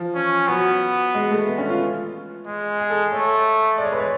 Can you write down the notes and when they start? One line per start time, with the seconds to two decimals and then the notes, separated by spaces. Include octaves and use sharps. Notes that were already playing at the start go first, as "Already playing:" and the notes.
Already playing: F3
0.15 C#4
0.48 F#3 B3
1.14 G#3
1.31 A3
1.47 B3
1.58 C#4
1.69 F4
2.46 G#3
2.79 G#4
2.90 A4
3.12 A3 C#5
3.78 G#3 D5
3.85 C#5
3.92 B4
4.00 C#5